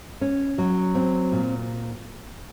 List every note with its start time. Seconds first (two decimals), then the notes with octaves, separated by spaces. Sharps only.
0.21 C#4
0.58 F#3
0.95 C4
1.32 A#2